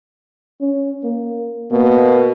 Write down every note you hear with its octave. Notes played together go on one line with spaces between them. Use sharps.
C#4
A#3
B2 A#3